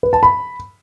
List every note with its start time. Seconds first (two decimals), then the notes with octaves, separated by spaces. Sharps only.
0.03 B4
0.13 A5
0.23 B5